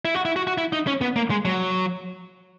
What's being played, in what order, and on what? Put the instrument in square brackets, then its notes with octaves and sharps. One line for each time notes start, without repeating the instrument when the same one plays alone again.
[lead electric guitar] E4
F#4
E4
F#4
F#4
E4
D#4
C#4
B3
A#3
G#3
F#3